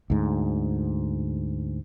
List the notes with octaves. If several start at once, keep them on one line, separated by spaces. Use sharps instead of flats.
D2 G#2